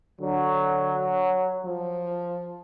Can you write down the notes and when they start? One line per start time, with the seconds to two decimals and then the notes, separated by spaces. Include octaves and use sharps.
0.21 D3 F#3
1.65 F3